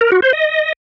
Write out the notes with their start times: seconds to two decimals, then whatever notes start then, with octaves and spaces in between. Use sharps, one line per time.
0.01 A#4
0.12 F#4
0.22 C5
0.33 D#5